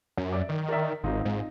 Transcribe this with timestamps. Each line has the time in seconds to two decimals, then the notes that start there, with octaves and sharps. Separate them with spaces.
0.17 F#2
0.33 D5 E5 D6
0.49 D#3
0.68 A#4 D5 E5
1.04 G#1 C4 D#4 F4
1.25 G#2